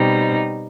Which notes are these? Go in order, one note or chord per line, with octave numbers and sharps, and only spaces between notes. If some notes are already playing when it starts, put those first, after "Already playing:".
Already playing: B2 G3 C4 D#4